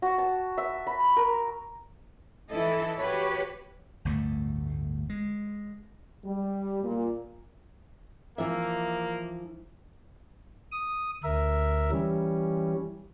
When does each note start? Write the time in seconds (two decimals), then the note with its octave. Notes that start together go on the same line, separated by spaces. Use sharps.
0.02 F#4
0.18 A5
0.58 E5
0.87 B5
1.17 A#4
2.50 E3 E4 A4 D#5
2.98 F#4 G4 B4 C#5
4.05 G1 D2 A2 A3
5.10 G#3
6.24 G3
6.84 A#2
8.38 E3 F3 A#3 E5
10.72 D#6
11.24 D2 A#4 E5
11.91 E3 G3 C#4